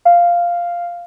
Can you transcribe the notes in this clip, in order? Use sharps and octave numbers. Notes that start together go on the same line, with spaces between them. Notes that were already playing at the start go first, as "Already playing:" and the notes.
F5